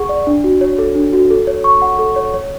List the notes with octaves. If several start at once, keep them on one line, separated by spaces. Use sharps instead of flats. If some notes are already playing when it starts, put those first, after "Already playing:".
Already playing: G#4 F#5 C#6
D5
D4
F#4
C#5
A4
D4
F#4
A4
C#5
C#6
F#5
A4
C#5
C#5